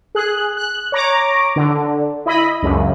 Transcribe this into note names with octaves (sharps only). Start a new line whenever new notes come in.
G#4 F#6
F#6
C#5 A#5 D6
D3
E4 D#5 B5
C#2 F#2